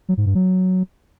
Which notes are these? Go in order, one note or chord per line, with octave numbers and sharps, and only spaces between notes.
F#3
G#2
G2
F#3